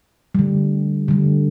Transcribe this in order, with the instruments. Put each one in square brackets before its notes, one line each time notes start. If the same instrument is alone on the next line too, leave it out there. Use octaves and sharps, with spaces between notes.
[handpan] D3 G3
D3 G3